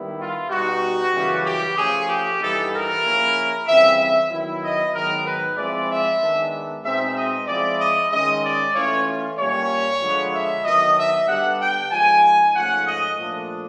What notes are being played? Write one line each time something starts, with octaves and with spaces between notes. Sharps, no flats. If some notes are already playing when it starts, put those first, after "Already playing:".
Already playing: D#3 G3 B3 E4
F4
B2 G3 B3 D#4 F#4
F#2 C#3 E3 G3
G4
F3 A3 C#4 G#4
G4
G2 E3 G3 B3 D#4 A4
A#4
C#3 F3 A#3 C#4 E4
C#3 E3 G3 C4 E5
E5
D#3 F#3 B3 E4
D#5
G#2 D#3 F#3 B3 A#4
B4
F3 G#3 C4 E4 D5
E5
D#3 G#3 B3 D4
B2 G#3 C4 D#4 E5
D#5
F3 G#3 C4 E4 D5
D#5
D#3 G#3 C#4 D#5
D5
E3 A3 C#4 F4 C#5
A#2 G3 A#3 C#4 C#5
D3 F3 G#3 B3
E5
D#3 F#3 B3 D4 D#5
E5
D3 G3 B3 D4 F#5
G5
G#2 F3 G#3 G#5
G#2 F3 A3 C#4 F#5
D#5
A#2 F3 A3 D4